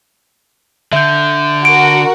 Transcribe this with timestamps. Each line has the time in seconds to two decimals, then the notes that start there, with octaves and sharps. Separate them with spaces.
0.93 D3 E5 G6
1.65 F#4 A#4 D7